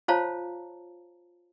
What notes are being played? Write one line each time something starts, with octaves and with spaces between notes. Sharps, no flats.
F4 C5 C#5 F5 A5 A#5